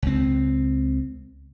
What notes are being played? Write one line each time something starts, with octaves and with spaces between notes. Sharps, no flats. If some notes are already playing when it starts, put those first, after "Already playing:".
C#2 C4